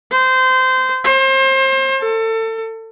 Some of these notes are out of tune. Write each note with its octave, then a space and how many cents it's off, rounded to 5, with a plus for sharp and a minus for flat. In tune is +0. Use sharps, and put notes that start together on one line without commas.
C5 -20
C5 +30
A4 +30